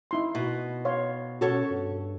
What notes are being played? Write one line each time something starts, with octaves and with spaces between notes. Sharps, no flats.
D#4 E4 C6
B2
C#5 F5 C6
B2 C#4 F#4 A4 C#5
G2